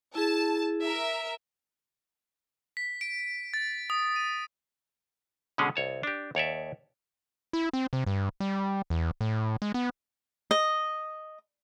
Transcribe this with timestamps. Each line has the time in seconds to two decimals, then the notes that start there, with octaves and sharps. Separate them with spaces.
0.15 E4 G#4 A5
0.80 A#4 E5
2.77 B6
3.01 D7
3.54 A6
3.90 D#6
4.16 D#7
5.58 B2 D3 G#3 C#4 G#4
5.76 C2 C#5 A5
6.03 D4 G4
6.35 D#2 C#5 D5 E5
7.53 E4
7.73 C4
7.93 C3
8.07 G2
8.40 G3
8.90 E2
9.21 A2
9.62 G#3
9.74 B3
10.51 D#5